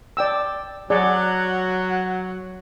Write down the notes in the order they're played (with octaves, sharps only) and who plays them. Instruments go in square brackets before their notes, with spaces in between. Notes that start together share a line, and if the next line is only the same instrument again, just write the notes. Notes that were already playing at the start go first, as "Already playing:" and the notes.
[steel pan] D5 G5 E6
[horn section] F#3 F#5 [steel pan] G#4 D5